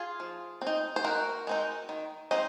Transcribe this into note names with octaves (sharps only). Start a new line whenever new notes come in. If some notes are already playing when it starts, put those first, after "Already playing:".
Already playing: F4 G#4
F3
C4
D#4
C5
D#3 F#4 A#4
G#3 C4 D#4
D#3
G#3 C4 D#4 C5 D#5